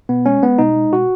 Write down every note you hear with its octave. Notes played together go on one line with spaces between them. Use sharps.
B2 B3
G#3 C#4
G#3 B3
B2 D#4
G#3
B2 F#4